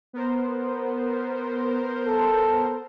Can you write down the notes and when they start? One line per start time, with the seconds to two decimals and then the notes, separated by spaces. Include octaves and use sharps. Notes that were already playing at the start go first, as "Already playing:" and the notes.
0.13 B3 A#4 C5
2.07 A4